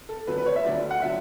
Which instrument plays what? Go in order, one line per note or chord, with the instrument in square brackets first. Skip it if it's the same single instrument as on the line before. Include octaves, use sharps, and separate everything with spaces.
[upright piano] A4
D2 D3 F#3 B4
B4
C#5
E5
D2 D3 F#3 D5
F#5
D3 F#3 E5